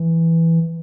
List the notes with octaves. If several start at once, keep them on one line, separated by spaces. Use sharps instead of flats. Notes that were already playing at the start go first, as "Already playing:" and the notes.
Already playing: E3